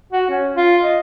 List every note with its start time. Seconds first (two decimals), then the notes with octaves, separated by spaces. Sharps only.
0.13 F#4
0.30 C#4
0.56 F4
0.83 D#5